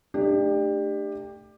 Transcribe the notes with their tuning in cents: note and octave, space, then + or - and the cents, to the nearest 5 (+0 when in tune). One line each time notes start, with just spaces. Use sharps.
A3 +0 D4 +30 G4 +20